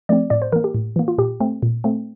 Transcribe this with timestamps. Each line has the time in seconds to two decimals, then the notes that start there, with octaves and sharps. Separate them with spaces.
0.09 F3 A3 C4 D5
0.30 A2 D5
0.42 C5
0.52 E3 A#3 A#4
0.64 G4
0.75 A2
0.96 E3 A#3
1.08 F4
1.18 A#2 G4
1.40 A3 C4
1.63 A#2
1.84 A3 C4